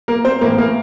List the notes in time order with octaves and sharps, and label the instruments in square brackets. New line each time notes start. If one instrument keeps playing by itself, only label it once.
[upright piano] A#3 A#4
C4 C5
A2 E3 A#3 A#4
A#3 A#4